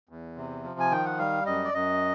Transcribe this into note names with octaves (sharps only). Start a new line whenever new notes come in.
E2
C3
F3
G#5
D#3 G5
F#5
G3 F5
F#2 D#5
D5
F#2 D#5